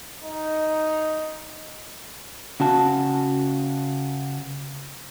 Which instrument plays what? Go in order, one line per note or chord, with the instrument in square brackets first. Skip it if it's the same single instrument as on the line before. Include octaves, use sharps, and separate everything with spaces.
[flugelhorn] D#4
[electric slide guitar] C#3 F#4 A5